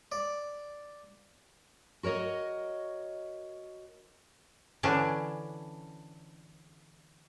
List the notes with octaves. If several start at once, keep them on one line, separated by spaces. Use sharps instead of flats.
D5
F#4 A#4 C#5 D#5
D3 E3 C#4 D4